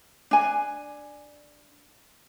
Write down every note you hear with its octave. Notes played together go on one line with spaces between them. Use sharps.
D4 G#5